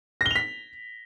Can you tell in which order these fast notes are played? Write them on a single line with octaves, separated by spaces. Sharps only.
A#6 G7 F7 B6